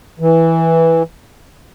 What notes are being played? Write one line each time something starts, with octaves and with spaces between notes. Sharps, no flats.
E3